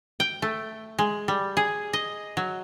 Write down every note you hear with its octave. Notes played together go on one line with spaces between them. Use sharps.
G5
A3
G#3
G3
G#4
D#5
F#3